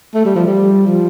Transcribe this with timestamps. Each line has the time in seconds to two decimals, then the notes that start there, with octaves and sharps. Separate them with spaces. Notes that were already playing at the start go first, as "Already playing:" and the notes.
0.14 A3
0.25 G3
0.36 F3
0.47 G3
0.87 F3